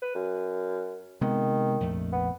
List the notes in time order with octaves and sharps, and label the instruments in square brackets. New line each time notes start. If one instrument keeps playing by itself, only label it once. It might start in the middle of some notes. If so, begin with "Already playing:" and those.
[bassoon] B4
F#2
[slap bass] C3 G#3 B3 [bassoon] D#3
[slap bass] A#1 F2 A3
[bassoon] B3